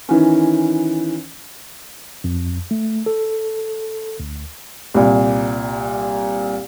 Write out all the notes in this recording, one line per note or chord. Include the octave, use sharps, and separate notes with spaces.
D#3 E3 C#4
F2
A3
A4
D2
C2 A#2